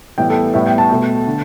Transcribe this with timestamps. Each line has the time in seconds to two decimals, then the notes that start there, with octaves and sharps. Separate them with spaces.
0.18 A2 E3 G3 B3 G5
0.30 A4
0.54 A2 G3 B3 E5
0.66 G5
0.78 A5
0.91 B2 A3
1.27 D3